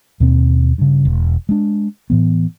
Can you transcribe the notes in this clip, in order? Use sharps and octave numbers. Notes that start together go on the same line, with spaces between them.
D#2 B2 C4
G2 C#3
E1
G#3 D4
A2 E3 B3